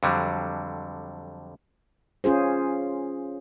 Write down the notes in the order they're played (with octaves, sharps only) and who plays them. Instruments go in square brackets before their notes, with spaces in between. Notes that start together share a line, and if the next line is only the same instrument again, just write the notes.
[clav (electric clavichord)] F2 D3 F#3 G3
[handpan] C#4 F4 G#4 C5